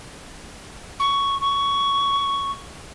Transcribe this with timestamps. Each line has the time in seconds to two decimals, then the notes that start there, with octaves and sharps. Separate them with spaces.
1.00 C#6
1.41 C#6